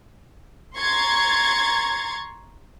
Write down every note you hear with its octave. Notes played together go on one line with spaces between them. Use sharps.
A#5 C6 C#6 G#6 A6